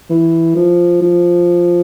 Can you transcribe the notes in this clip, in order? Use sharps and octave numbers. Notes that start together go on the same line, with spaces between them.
E3
F3
F3